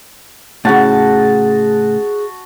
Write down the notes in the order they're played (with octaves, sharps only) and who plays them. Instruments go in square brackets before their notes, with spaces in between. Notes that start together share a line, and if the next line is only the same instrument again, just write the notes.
[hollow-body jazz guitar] A2 C#3 [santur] F#4 A5 [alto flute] G#4